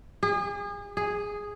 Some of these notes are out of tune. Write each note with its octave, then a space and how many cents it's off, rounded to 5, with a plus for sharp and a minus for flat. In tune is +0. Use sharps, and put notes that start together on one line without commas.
G#4 -35
G#4 -5